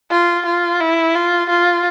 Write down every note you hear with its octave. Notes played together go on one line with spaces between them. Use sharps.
F4
F4
E4
F4
F4